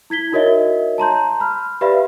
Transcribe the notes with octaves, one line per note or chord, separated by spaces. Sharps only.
E4 G#6 B6 G7
D#4 F#4 A#4 C#5 D#5 E5
A5 A#5 C6 G6
B5 F6
G4 B4 D5 E5 F5 B5